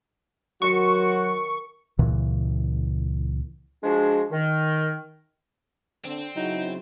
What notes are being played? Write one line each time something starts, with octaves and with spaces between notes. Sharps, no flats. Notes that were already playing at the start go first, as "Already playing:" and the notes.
D#3 F#3 F#4 E5 C6 C#6
C#2 A#2 C#3 E3
F3 G#3 D4 F#4 G#4
D#3
D3 C4
C#3 F#3 D#4 E4